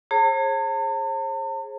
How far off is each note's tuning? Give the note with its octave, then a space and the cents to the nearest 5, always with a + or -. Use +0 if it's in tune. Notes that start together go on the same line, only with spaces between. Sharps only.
G#4 +0 C5 +45 A5 +45